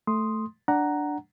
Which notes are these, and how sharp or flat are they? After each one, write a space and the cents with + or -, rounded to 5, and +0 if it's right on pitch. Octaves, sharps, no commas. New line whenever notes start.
A3 +0 C6 +0 D#6 +0
D4 +0 F#5 +10 A#5 +0